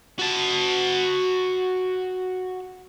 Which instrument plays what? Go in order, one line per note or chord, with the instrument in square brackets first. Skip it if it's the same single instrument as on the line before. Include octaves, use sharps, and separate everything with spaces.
[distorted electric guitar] F#4 A5